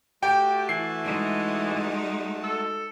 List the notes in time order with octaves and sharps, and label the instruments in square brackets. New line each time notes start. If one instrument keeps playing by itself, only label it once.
[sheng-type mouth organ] A3 F#4 A5 [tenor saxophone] G4 [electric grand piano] G5
[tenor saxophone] E3 [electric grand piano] C7
[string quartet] G#3 D#4
[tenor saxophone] A4